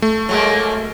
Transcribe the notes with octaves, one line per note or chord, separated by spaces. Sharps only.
A3
F#3 G#3 A#3